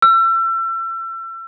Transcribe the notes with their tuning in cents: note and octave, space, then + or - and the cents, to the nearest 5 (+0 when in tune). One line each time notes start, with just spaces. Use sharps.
E6 +35